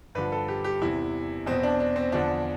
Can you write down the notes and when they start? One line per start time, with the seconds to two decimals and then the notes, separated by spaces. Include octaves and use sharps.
0.15 G2 D3 F3 B4
0.32 A4
0.48 G4
0.64 G4
0.82 E2 C3 E3 E4
1.46 E2 B2 C4
1.63 D4
1.80 D4
1.96 C4
2.12 E2 D3 F3 D4